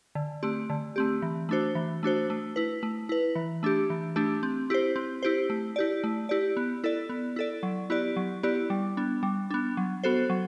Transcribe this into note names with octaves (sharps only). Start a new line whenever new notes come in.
D3
A3 C4 G4
D3
A3 C4 G4
E3
A3 D4 F#4 C5
E3
A3 D4 F#4 C5
A3
E4 B4
A3
E4 B4
E3
A3 D4 G4
E3
A3 D4 G4
C4
E4 G4 C5
C4
E4 G4 C5
A3
E4 G4 D5
A3
E4 G4 D5
B3
E4 A4 D5
B3
E4 A4 D5
F#3
B3 E4 G4 D5
F#3
B3 E4 G4 D5
G3
B3 D4
G3
B3 D4
F#3
B3 F#4 A4 C5
F#3